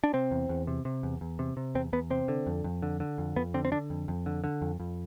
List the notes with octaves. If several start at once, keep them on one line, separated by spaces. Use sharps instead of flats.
D4
C3 C4
E2
E2
C3
C3
E2
E2
C3
C3
E2 C4
E2 B3
C3 C4
D3
F2
F2
D3
D3
F2
F2 B3
D3 C4
C4
D3 D4
F2
F2
D3
D3
F2
F2